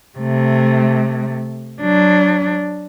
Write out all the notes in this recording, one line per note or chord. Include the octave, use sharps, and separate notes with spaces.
C3 A3
F#3 D4